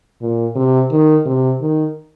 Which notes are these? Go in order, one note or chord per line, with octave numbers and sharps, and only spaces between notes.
A#2
C3
D#3
C3
D#3